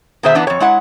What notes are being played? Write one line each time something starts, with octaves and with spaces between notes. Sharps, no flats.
B2 D#3 G#4 C5 E5
E3 B3 D4
F2 C#5
G#3 E4 F#5